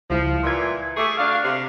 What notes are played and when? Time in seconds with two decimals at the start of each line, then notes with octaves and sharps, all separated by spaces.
0.10 C#2 F3 G3 E4
0.43 A#2 E3 C6 G#6
0.97 A3 G#4 C#6 D6
1.18 D2 D4 F5
1.43 C3